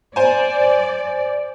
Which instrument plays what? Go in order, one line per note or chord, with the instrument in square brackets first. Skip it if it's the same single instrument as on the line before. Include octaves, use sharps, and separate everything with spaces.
[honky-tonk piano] C5 G#5 [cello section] D5